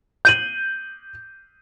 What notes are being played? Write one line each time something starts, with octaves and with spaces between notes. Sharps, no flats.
G6 D#7 F#7